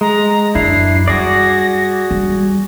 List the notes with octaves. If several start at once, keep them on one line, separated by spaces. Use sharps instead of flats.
G#3 A#5
F#2 D4 E4 C7
G3 F#4 G#4 D5 A#6
G3